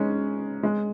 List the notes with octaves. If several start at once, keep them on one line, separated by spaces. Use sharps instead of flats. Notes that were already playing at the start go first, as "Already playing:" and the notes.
Already playing: G#3 C#4 D#4
G#3